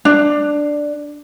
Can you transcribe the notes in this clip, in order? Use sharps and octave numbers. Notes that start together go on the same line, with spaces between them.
D4